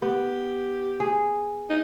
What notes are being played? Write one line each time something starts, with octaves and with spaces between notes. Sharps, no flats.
B3 G4
G#4
D#4